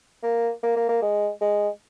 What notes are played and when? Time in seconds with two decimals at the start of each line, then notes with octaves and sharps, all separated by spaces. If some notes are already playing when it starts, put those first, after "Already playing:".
0.23 A#3
0.63 A#3
0.76 A#3
0.89 A#3
1.02 G#3
1.41 G#3